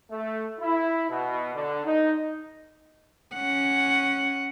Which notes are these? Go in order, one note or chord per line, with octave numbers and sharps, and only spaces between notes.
A3
E4
B2
D3
D#4
C#4 F#5